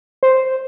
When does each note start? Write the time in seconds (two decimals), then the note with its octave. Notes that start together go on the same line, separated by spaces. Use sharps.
0.23 C5